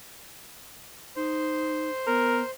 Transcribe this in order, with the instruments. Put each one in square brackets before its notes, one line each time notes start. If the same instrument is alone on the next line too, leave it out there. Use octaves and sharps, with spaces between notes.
[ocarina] D#4 [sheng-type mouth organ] C5
[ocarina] B3 [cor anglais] A#4